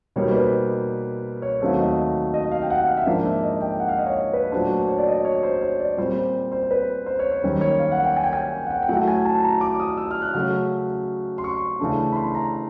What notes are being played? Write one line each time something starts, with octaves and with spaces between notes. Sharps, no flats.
B2 G3 A#3 D#4 C#5
C5
B4
C#5
D#2 D#3 F#3 A3 C4
D#5
D#5
F5
G5
F#5
F#5
F5
E5
G#2 F3 A#3 D4 F5
E5
D#5
G5
F#5
F5
D#5
C#5
B4
A#2 F#3 A3 D4 C5
C5
C#5
D5
D#5
C#5
C5
C#5
D5
A#2 G3 C4 C5
C5
C5
B4
C5
C#5
C5
F#2 D#3 G3 A#3 C#4
C#5
F5
F#5
G5
G#5
G5
G#5
G5
F#5
G5
G5
A2 F#3 A3 F#5
G#5
A5
A#5
D6
D#6
E6
F6
F#6
C#3 F#3 A3 C#4 F6
C6
C#6
C#3 E3 A3 D4
B5
C6
A#5